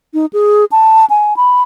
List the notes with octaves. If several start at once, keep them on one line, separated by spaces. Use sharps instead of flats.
D#4
G#4
A5
G#5
B5